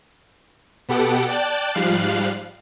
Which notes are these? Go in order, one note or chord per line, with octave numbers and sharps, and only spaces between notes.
B2 B3 G4 A4 F#5 D7
D5 G5 A5 F#6
G#2 F3 G3 F5 F#6 C7